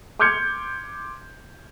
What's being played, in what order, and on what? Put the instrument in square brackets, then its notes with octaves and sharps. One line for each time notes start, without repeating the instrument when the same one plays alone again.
[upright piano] C6 D6 F6 G6 G#6 C#7